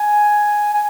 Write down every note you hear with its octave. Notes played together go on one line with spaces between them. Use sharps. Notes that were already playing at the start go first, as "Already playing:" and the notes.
Already playing: G#5
G#5